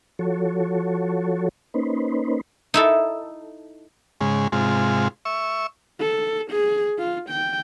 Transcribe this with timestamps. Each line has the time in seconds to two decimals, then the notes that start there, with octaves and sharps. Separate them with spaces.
0.19 F3 F#4 A4 C#5
1.74 A#3 C#4 D#4 B4 C5
2.74 D#4 E4 A4
4.21 G#2 C#3 G#3
4.52 G#2 C3 G#3 F4
5.25 E5 C#6
6.00 A4
6.51 G#4
6.99 F4
7.30 G5